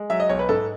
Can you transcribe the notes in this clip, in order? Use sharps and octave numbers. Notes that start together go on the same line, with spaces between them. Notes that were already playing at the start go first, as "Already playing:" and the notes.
Already playing: G#3
F#3 E5
D#5
B1 C#5
B4
G#2 A4